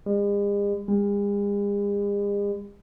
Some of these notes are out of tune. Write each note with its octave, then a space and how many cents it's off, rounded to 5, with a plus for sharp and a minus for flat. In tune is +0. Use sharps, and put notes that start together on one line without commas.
G#3 -45
G#3 -45